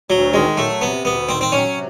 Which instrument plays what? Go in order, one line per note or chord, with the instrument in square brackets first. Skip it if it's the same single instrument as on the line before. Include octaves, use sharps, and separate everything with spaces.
[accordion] D2 [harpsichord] F#3
[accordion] D#3 [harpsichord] G#3
[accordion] F#3 [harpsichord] A3
[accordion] C3 [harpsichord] B3
[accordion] D2 [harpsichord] B3
[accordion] D#3 [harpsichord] C4
[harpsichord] C4
[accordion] F#3 [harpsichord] C#4
[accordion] C3